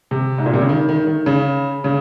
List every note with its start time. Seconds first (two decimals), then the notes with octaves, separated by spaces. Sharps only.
0.11 C3
0.38 G#2
0.46 A#2
0.54 C3
0.61 C#3
0.69 D#3
0.89 D#3
1.07 D#3
1.26 C#3
1.84 C#3